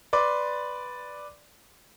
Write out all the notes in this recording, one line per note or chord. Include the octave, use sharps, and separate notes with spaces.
B4 D5 C6 D6